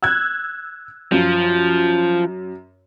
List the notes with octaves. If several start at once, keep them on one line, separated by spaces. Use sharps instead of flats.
E6 F#6 G#6
F#2 F3